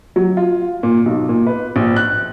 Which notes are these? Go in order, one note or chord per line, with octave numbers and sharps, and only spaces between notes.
F#3
F4
A#2
B1
A#2
B4
A#1
F#6